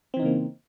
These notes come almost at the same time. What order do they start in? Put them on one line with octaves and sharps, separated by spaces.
C4 E3 D#4 C#3 A#3